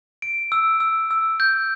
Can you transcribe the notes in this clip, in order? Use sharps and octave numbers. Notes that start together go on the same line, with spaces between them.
D7
E6
E6
E6
G6